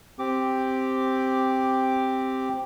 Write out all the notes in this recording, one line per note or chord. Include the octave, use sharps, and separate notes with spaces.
C4 G4 D6